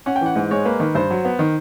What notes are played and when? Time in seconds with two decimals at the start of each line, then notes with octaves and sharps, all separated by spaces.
0.06 C#4 F#5
0.16 G5
0.21 E3 F#5
0.36 G#2
0.51 G#3 C#5
0.65 A#3 B4
0.80 D#3 B4
0.95 G2 C5
1.10 F#3
1.25 B3
1.39 D#3